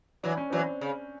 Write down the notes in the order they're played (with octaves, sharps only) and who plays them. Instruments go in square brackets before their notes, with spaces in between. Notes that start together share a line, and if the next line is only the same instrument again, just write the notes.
[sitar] E3 F#3 [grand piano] D4
[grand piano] C#4
[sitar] E3 F#3 [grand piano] C4 D4
[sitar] C#3